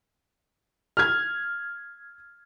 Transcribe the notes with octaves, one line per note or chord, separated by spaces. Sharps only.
F6 G#6